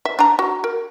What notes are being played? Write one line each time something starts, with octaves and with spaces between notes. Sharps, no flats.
E5
D4 A#5
F#4
A#4